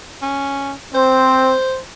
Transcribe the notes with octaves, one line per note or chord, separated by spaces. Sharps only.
C#4
C4 C5